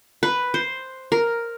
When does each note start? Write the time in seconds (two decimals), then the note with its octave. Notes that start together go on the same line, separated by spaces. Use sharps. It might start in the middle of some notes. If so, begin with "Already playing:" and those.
0.23 B4
0.54 C5
1.12 A#4